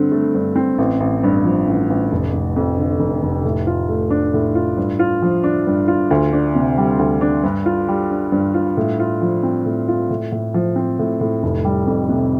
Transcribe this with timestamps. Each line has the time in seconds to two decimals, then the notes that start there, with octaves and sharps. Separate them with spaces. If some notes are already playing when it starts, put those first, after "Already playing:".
Already playing: G2 D3 C4
0.12 A3
0.35 G2
0.56 C4
0.78 A1
1.00 A1
1.23 G2
1.45 F3
1.68 A1
1.90 A1
2.12 F1
2.33 F1
2.56 F2
2.78 D3
3.00 F1
3.23 F1
3.45 A2
3.67 F4
3.89 A3
4.10 D4
4.34 A2
4.55 F4
4.77 G2
4.99 F4
5.22 F3
5.44 D4
5.67 G2
5.88 F4
6.11 D2
6.33 D4
6.55 C3
6.78 G3
6.99 D2
7.21 D4
7.43 G2
7.66 F4
7.88 G3
8.11 D4
8.32 G2
8.54 F4
8.77 A2
9.00 F4
9.22 F3
9.43 C4
9.66 A2
9.88 F4
10.10 A2
10.32 A2
10.54 F3
10.76 C4
10.99 A2
11.21 A2
11.43 F1
11.64 G3
11.87 F2
12.09 C3